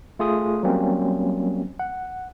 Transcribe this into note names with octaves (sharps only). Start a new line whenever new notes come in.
A3 F4 G#4 D#6
F#3 G3 A#3 C4 C#4
F#5